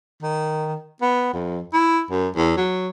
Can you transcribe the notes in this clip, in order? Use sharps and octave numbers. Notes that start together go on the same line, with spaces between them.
D#3
B3
F2
E4
F#2
E2
F#3